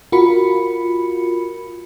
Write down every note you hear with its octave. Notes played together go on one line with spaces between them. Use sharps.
F4 F#4 A#4 B5 C#7